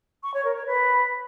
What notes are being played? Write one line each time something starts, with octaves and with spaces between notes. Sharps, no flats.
C#6
C#5
A#4
C#5
B4